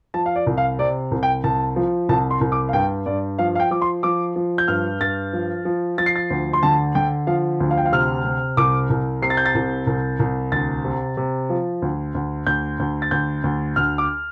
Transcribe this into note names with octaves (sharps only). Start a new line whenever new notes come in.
F3 A5
F5
D5
C2
F5
C3 D5
C2
G5
C2 A5
F3
C2 A5
C6
C2
D6
F5
G2 G5
G2 D5
F3 F5
F5
G5
F3 D6
C6
F3 D6
F3
G6
G2 F6
G2 A6
F3
F3
F3 A6
C7
A6
D2
C6
D3 A5
D3 G5
F3 F5
D2
F5
G5
F5
C3 F6
C3
C2 D6
C2
C3 C7
A6
G6
A6
C2
C2
C2
D2 A6
C3
C3
F3
D2
D2
D2 G6
D2
A6
D2 G6
D2
D2 F6
D6